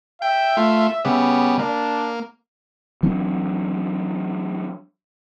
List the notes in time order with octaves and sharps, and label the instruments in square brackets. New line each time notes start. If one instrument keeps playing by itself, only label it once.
[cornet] E5 [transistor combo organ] G5
[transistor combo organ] A3 F4
C#3 G3 B3
[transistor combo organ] A#3 [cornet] D4
[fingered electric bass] E3 F#3 C4 D4